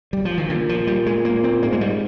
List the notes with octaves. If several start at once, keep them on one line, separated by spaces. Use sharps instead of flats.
G3
F3
D#3
A#2 D3
F3
G3
G#3
A#3
C4
G#2 A#3
G#3
G3